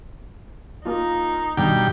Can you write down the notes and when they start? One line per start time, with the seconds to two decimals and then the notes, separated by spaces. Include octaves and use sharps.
0.85 A#3 D#4 F4
1.57 G2 B2 D#3 G5